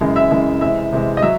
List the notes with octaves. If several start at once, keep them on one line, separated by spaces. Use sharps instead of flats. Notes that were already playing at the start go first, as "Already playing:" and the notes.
F#2 C#3 E3 G#3
E5
F#2 C#3 E3 G#3
C3 E3 G#3 E5
C3 E3 G#3
D#5
F#3 E5